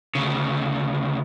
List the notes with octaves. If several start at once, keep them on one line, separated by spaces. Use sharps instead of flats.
D2 C#3